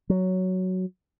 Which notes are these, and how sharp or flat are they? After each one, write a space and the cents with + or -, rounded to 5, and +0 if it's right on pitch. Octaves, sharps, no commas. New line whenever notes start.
F#3 +5